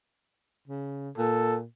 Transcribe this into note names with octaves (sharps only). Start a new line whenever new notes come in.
C#3
A#2 A4